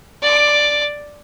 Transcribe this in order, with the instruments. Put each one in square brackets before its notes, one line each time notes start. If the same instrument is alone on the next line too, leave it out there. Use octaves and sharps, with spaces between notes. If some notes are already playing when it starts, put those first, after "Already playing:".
[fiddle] D5 D6